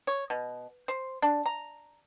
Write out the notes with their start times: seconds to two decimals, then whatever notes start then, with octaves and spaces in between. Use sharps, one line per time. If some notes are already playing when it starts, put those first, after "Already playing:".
0.07 C#5
0.30 B2
0.88 C5
1.22 D4
1.46 A#5